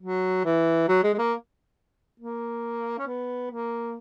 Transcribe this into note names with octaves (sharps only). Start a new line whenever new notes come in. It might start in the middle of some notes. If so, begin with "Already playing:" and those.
F#3
E3
F#3
G#3
G#3
A#3
A#3
C#4
B3
A#3